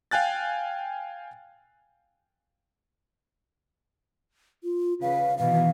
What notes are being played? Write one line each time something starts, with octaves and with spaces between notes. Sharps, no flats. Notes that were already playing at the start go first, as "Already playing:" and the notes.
F5 G5 G#5 F#6 A6
F4
C#3 B4 F5
B2 D#3 E3 F5